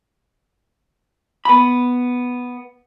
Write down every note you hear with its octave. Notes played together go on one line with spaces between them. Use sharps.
B3 B5